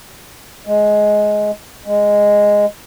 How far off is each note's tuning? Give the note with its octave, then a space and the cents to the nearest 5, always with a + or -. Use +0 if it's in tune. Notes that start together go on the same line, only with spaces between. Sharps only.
G#3 +10
G#3 -10